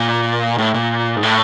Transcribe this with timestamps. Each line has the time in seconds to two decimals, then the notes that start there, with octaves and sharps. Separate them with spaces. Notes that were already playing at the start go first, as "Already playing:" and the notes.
Already playing: A#2
0.58 A2
0.74 A#2
1.16 G#2
1.23 A2